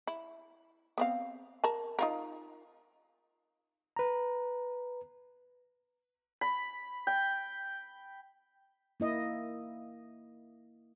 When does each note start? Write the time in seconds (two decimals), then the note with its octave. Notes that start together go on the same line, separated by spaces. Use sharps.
0.07 E4
0.98 B3 C4 F5
1.64 A#4 A5
1.99 D#4 F4 A#4
3.96 B4 A#5
6.41 B5
7.07 G5
9.00 A#3 E4 D#5